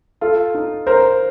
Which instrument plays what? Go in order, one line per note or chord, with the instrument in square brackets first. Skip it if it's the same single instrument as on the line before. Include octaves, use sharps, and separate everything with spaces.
[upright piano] F4 [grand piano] A4
[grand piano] D#4
[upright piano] A#4 [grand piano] C5